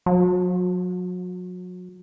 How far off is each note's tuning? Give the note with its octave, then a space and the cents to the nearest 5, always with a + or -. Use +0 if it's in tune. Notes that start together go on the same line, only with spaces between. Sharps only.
F#3 -35